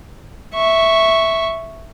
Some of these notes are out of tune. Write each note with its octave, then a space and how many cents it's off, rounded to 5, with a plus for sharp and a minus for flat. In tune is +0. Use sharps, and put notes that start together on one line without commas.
E5 -5 C#6 +0